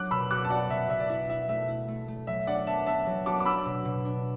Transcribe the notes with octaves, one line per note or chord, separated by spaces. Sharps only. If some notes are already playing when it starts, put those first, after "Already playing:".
Already playing: F#3 D4 D6 F#6
B2 B5 E6
F#4 D6 F#6
A5
F#4 D5 F#5
B2 E5
B2 E5
D5
E4 E5
E4 E5
A3 E5
E4
A3
A3
F#3 E5
D4 D5 F#5
B3 E5 A5
B3 E5 A5
F#3
F#4 A5 D6
D6
D4 B5 E6
B2
B2
D4